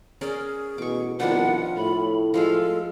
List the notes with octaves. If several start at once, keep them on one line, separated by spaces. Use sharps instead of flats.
C#4 G#4 A#4 D5
A1 B2 C#6 D6
C2 B2 D#3 F3 B3 D4 F4 F#5
A2 B5
F3 G#3 F4 A4 F5